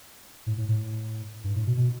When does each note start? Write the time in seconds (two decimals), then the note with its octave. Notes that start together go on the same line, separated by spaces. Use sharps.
0.46 A2
0.57 A2
0.69 A2
1.44 G2
1.55 A2
1.66 B2
1.77 B2